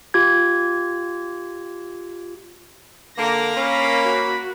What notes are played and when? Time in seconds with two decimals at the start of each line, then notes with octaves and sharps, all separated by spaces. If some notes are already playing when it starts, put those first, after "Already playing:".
0.14 F4 G4 G#6
3.18 D3 A#3 F5 A#6
3.57 C#4 B5
4.03 F#4